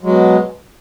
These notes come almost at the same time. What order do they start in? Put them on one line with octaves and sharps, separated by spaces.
F#3 G#3 B2